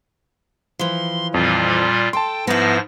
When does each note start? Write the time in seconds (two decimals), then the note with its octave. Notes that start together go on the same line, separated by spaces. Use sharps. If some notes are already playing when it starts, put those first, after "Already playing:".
0.79 E3 F3 C6
1.34 F2 A#2 G3 F4
2.13 A4 G5 A5 C6
2.47 G#2 F3 B3 E4 A#6